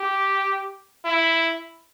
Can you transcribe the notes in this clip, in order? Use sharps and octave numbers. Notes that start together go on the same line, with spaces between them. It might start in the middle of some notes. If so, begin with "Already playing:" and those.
Already playing: G4
E4